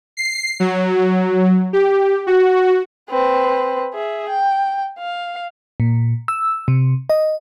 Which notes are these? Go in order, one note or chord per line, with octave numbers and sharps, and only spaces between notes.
C7
F#3
G4
F#4
C4 B4
G#4 E5
G5
F5
A#2
E6
C3
D#5